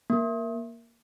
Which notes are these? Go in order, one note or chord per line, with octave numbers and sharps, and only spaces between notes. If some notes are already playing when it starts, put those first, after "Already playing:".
A#3